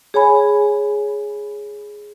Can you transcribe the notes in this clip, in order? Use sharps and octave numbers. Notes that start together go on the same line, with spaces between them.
G#4 C#5 G#5 B5